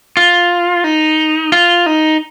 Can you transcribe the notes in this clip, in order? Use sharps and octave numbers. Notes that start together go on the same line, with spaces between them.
F4
D#4
F4
D#4